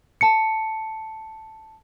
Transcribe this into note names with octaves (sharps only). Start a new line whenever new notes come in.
A5 C#7